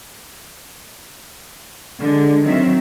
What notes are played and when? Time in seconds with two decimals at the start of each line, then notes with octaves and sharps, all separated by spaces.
2.00 D3 G#3
2.45 D#3 F#3 C4 E5